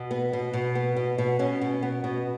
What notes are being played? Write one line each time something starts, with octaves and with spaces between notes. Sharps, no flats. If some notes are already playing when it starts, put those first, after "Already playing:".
Already playing: B2
B3
B2
B2
B3
B2
B2
B2 C#4
B2
B3
B2